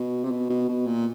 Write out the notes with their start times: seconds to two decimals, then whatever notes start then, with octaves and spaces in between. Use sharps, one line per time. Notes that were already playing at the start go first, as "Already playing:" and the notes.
Already playing: B2
0.24 C3
0.31 B2
0.50 B2
0.68 B2
0.86 A#2